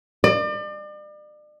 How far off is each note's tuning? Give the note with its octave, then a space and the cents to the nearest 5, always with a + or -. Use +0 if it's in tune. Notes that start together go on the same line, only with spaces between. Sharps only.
D5 +40